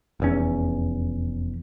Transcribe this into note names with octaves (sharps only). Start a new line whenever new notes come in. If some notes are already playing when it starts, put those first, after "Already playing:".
F1 E2 C#4